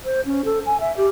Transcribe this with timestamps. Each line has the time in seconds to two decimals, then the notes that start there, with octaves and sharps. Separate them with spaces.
0.05 C5
0.26 C#4
0.45 A4
0.66 G#5
0.80 E5
0.97 G4